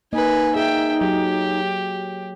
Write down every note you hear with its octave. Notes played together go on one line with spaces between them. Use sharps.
A#3 D#4 B4 D#5 G#5
G#4 E5 G5
F#3 G4